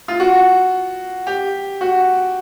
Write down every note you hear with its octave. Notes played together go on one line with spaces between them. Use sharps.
F4
F#4
G4
F#4